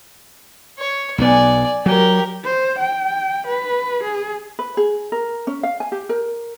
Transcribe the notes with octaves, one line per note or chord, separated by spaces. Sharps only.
C#5
B1 F#3 B3 D5 G#5
F#3 G4 A#4
C5
G5
B4
G#4
B4
G#4
A#4
C#4
F5
G#5
G4
A#4